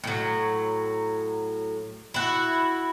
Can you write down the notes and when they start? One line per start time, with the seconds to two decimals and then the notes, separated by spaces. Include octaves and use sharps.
0.04 A2 F#3
2.14 E4 F#4